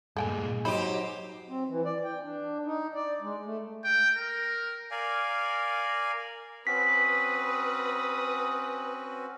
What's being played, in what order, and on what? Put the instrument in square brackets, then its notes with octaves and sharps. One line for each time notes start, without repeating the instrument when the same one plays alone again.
[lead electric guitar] G2 A#2 [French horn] G#3 [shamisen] A4 G5 G#5
[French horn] F#3 [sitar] D#4 G4 [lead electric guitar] C5 [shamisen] B5
[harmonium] C4
E3
D5
G5
D4
D#4
D5
G#3
A3
[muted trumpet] G5
A#4
[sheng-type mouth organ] A#4 D5 F5 G#5
[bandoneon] C4 C#4 F#4 [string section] B4 [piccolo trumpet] D#6 [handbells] B6